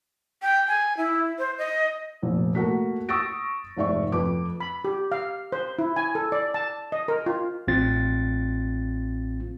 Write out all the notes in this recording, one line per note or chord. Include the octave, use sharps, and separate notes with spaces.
G5
G#5
E4
C5
D#5
F1 A#1
A3 A#3 F#4 B6
C#6 D#6 E6 A6 A#6 D7
F1 G#2 D5 E5 C#6
F2 B4 D6
B5
G4
F5
C5
E4
G#5
A4
D5
A5
D#5
A#4
F4
A1 C4 F4 A6